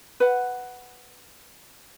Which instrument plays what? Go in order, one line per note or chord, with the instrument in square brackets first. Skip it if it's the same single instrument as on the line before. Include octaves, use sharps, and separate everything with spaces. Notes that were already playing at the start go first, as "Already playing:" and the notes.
[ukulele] B4 F#5